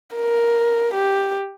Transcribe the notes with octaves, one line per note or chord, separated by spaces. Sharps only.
A#4
G4